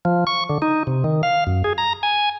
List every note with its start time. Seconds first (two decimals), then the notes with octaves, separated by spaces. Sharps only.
0.05 F3
0.27 C#6
0.49 D3
0.62 D#4
0.87 C3
1.04 D#3
1.23 F5
1.47 F#2
1.64 G#4
1.78 A#5
2.03 G#5